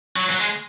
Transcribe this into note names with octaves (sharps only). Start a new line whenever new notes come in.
F#3
F#3
G#3